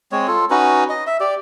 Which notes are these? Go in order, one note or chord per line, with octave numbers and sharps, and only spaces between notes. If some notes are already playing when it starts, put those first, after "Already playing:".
G#3 C4 C#5
F4 A4
C#4 D#4 F#4 B4
D#5
E5
G4 D5